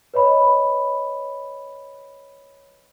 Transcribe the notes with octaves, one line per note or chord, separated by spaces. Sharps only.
B4 C#5 D#5 B5